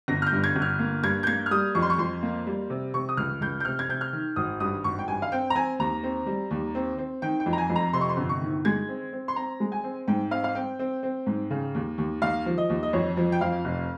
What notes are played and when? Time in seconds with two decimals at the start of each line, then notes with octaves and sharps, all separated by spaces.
0.08 G1 A#6
0.22 F6
0.27 G6
0.32 G2
0.44 G#6
0.56 G1
0.62 F6
0.79 A#3
1.03 G2 G#6
1.23 G6
1.27 A#3 G#6
1.46 F6
1.51 G3 D#6
1.75 F2 C#6
1.82 C6
1.90 C#6
1.98 F2 C6
2.23 A#3
2.47 G3
2.70 C3
2.94 C3 C#6
3.09 D#6
3.17 C#2 F6
3.41 C#2 G6
3.60 G6
3.65 C3 F6
3.79 G#6
3.89 C3 G6
4.01 F6
4.13 D#3
4.36 G#1 D#6
4.60 G2 D#6
4.84 G#1 C#6
4.99 G5
5.08 G2 G#5
5.22 F5
5.32 C4 G5
5.50 A#5
5.55 C4 G#5
5.79 D#2 A#5
6.04 C4
6.26 G3
6.51 D#2
6.75 C4
6.98 C4
7.22 D#3 G5
7.40 G5
7.46 F2
7.53 A#5
7.58 G#5
7.70 F2
7.76 A#5
7.93 C3 C6
8.01 C#6
8.09 C6
8.17 G1
8.29 C#6
8.42 D#3
8.65 G#3 G#6
8.89 C4
9.13 C4
9.28 C6
9.36 C4 A#5
9.60 G#3
9.72 G#5
9.84 C4
10.08 G#2 G5
10.31 C4 F5
10.44 F5
10.55 C4 G5
10.79 C4
11.03 C4
11.26 G#2
11.51 C#3
11.75 D#2
11.98 D#2
12.22 D#2 F5
12.46 F3
12.58 D#5
12.70 D#2
12.83 D#5
12.93 F2 C#5
13.17 F3
13.32 G5
13.41 F2 F5
13.65 F1